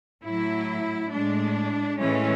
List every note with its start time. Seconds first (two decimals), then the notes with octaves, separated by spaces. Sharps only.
0.24 A2 F#3 E4
1.12 A2 G#3 D4
1.99 A2 E3 G#3 C#4